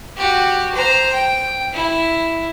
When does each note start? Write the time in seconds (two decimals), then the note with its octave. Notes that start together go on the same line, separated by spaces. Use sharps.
0.17 F#4 G4
0.75 C5 A#5
1.13 G5
1.74 E4